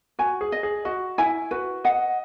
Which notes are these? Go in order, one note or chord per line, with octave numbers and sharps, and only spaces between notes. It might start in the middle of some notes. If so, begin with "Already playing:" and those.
F#4 G#5
G#4
D#5
G#4
F#4 D#5
E4 G#5
F#4 B4
D#5 F#5